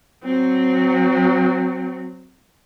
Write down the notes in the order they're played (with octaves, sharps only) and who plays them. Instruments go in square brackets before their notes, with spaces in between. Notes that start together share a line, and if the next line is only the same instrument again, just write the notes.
[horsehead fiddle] F#3 C4